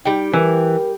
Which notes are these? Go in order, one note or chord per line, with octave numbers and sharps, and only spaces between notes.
G3 D#4 G5
E3 A#4